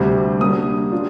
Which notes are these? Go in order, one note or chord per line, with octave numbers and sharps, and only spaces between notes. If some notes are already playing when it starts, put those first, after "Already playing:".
Already playing: D2 C3 G3
D3 G3 A#3 D#6
G3 D4 F4